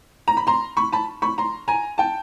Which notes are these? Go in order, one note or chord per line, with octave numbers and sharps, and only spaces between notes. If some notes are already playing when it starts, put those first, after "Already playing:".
A#5
B5
A#5 C6
B5 C#6
A5 B5
B5 C#6
A#5 C6
G#5 A#5
G5 A5